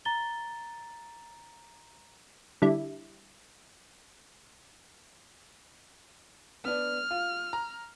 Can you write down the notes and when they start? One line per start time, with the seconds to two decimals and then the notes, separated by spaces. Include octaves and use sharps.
0.05 A#5 A6 G7
2.62 D3 G3 E4
6.65 B3 D4 F6
7.11 F4
7.53 A#5